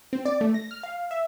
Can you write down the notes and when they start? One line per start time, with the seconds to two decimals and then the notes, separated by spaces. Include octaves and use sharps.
0.13 C4
0.25 D5
0.41 A3
0.54 A#6
0.71 F6
0.83 F5
1.11 E5